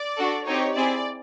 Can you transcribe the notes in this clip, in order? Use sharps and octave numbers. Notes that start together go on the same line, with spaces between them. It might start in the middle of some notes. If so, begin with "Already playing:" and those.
Already playing: D5
D4 F#4 A4
C4 D#4 G4 C#5
C4 E4 G#4 D5